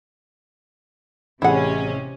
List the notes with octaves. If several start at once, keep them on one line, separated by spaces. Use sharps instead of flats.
A1 C3 C#4 E4 G#4 F#5